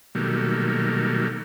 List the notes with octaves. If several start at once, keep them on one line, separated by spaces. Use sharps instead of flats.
B2 D#3 F#3 G3 A3 A#3